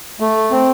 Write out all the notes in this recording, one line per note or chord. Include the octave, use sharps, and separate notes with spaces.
A3
C4